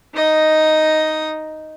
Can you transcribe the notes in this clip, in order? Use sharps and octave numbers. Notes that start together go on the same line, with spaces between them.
D#4 D#5